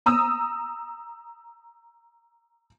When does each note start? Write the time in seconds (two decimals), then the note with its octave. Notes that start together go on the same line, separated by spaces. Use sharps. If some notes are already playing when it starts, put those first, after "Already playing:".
0.06 A#5 D#6 E6